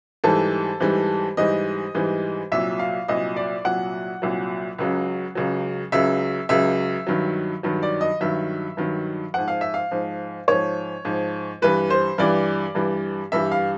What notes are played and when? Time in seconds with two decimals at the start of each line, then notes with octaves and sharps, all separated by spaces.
0.24 G#2 E3 G3 A4
0.80 G#2 E3 G3
1.37 G#2 E3 G3 D#5
1.95 G#2 E3 G3
2.52 C2 A#2 F#3 E5
2.79 F5
3.08 C2 A#2 F#3 D#5
3.36 D5
3.65 C2 A#2 F#3 F#5
4.22 C2 A#2 F#3
4.78 C#2 C#3 F#3
5.35 C#2 C#3 F#3
5.92 C#2 C#3 F#3 E5
6.49 C#2 C#3 F#3 E5
7.07 G2 D#3 F#3
7.63 G2 D#3 F#3
7.83 D5
8.01 D#5
8.21 G2 D#3 F#3 E5
8.77 G2 D#3 F#3
9.34 G#2 F3 F#5
9.48 F5
9.61 E5
9.74 F5
9.91 G#2 F3
10.48 G#2 F3 C#5
11.05 G#2 F3
11.62 G2 E3 G3 B4
11.90 C5
12.18 G2 E3 G3 D5
12.75 G2 E3 G3
13.32 G2 E3 G3 E5
13.52 F5